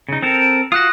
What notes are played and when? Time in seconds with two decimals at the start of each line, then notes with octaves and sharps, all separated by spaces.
0.09 C#3 D#4
0.22 C4 A4 A#4
0.72 F4 F#4 D#6 F#6 A#6